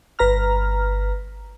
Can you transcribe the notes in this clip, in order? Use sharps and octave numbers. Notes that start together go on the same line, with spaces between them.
G1 B4 A#5 F6